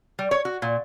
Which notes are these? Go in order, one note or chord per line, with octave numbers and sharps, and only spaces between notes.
G3
C#5
F#4
A#2